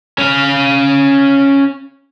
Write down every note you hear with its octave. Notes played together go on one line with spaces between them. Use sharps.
C#4 F5